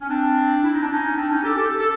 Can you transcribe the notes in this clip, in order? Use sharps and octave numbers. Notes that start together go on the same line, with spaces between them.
C#4
C4 D4
E4
D#4
D4
C#4 D#4
C4 D4
C#4 D#4
G4 A4
G4 A4
A4